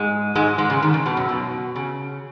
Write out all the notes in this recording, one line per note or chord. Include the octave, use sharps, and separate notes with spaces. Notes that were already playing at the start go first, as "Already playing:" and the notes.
Already playing: G#2 G#3
G#2 G#3
G#2 G#3
C#3
D#3
C#3
B2
F#2
B2
C#3